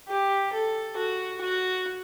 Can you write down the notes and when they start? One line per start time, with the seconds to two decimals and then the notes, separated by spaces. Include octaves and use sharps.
0.08 G4
0.53 A4
0.97 F#4
1.41 F#4